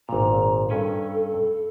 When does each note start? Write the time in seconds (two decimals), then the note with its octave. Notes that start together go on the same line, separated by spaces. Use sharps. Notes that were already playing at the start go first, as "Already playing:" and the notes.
0.09 G#1 A#2 A#5
0.70 G2 C#4 A4 G#5